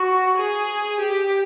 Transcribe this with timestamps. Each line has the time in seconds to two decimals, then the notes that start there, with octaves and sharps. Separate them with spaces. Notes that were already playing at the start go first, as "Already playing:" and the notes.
Already playing: F#4
0.37 G#4
1.00 G4